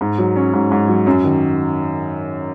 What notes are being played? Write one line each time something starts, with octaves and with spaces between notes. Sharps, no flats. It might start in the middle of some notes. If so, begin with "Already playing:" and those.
G#2
F#3
C#4
G#2
G#2
F#3
F#2
D#3